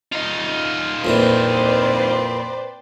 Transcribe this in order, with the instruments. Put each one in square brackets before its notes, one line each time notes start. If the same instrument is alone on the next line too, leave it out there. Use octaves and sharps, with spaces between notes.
[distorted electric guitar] D#4 F4
[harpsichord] F2 A#2 E3 [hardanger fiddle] C4 [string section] B4 C5 D5